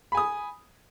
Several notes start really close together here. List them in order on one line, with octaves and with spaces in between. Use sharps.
B5 G#5 D#6